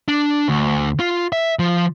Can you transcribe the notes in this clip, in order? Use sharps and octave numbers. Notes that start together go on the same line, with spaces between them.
D4
D2
F4
E5
F3